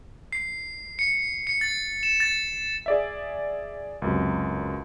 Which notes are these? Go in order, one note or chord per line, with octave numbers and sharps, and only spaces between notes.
C7
C#7
C#7
A6
E7
A6
G#4 D5 E5
C#2 F#2 C3